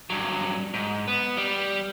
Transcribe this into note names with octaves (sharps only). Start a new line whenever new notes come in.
G2 F#3
G#2
B3
G3